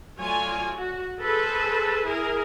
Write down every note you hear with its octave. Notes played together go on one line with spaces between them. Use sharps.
F#3 A3 F4 C#5 D5 G#5
F#4
G#4 A4 B4 C5
E4 G#4 A#4